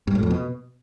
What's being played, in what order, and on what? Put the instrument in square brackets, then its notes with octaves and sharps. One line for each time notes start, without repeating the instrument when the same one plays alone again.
[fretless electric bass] G2
A2
F2
B2